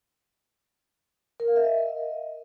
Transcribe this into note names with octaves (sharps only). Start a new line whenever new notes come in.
A#4
F5
E5
D#5